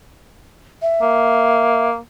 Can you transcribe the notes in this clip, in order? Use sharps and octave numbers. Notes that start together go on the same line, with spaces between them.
E5
A#3